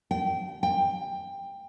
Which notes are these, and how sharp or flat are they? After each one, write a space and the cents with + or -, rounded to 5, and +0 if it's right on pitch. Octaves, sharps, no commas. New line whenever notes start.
G5 -25
G5 +15